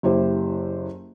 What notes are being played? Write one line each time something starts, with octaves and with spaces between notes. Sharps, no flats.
F#1 E4 G4 C5